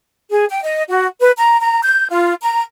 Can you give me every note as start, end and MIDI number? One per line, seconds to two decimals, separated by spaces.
0.30 0.45 68
0.49 0.59 79
0.63 0.83 75
0.88 1.07 66
1.20 1.30 71
1.36 1.59 82
1.59 1.80 82
1.82 2.07 91
2.09 2.34 65
2.42 2.62 82